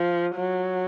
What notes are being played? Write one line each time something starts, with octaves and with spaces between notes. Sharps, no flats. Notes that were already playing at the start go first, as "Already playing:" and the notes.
Already playing: F3
F#3